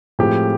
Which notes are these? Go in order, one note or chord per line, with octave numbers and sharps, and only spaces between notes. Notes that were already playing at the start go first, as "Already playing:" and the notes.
A2 F3 G#3 C4 G4